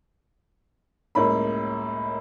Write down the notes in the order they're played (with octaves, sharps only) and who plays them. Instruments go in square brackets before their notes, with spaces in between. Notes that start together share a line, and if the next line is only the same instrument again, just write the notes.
[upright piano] C#2 F#2 A2 A#3 C#5 B5